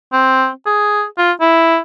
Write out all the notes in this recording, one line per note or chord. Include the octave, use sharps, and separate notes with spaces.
C4
G#4
F4
E4